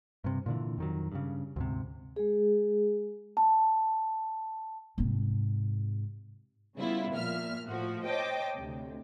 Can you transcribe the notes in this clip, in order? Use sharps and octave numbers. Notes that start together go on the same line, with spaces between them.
G2 C3
A#2 D3 E3
F2 D#3 F#3
G2 C#3
D2 G#2 C3
G#3 G#4
A5
G#2 C3
C#3 G3 B3 E4 F4
A#2 F3 E5 F6
A2 F3 F#4
C5 C#5 D#5 G5 A5 D6
D2 C3